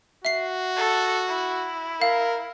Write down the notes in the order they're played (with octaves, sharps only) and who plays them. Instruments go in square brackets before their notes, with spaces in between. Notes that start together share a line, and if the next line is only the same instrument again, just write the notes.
[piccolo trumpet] F#4 [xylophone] E5 C7
[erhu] A4
E4
[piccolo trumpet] A#4 [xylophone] F5